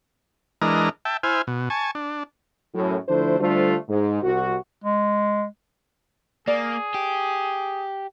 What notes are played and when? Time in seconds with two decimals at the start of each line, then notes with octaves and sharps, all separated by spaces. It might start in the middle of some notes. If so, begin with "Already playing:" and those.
0.62 E3 G#3 D4 A#4 D#5 A#5
1.05 E5 G5 A5
1.23 E4 C5 G#5 F6
1.47 B2
1.70 G#5 A5 C#6
1.95 D4
2.74 F#2 A2
3.08 D3 F3 A3 D4 E4 C5
3.40 D3 G3 A3 D4 F4 C5
3.89 G#2
4.23 C2 F#4
4.84 G#3
6.47 A#3 G#4 D5
6.94 G4